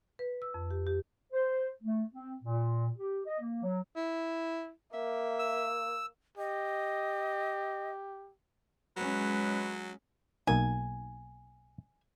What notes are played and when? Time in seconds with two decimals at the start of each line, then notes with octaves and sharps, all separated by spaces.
0.19 B4
0.42 E6
0.54 F2
0.71 G4
0.87 G4
1.33 C5
1.83 A3
2.14 C4
2.44 A#2
2.98 G4
3.26 D#5
3.40 A#3
3.63 F#3
3.96 E4
4.93 A#3 E5
5.39 E6
6.38 G4 D#5
8.97 F#3 G#3 C#4 B4
10.47 B1 A#3 D#4 G#5